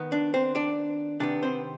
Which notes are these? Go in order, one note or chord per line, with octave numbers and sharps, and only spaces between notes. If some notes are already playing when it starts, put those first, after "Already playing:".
Already playing: D#3 B3
D4
C4 C5
D4 D5
C3 D#3 B3 D4 D5
C4 C5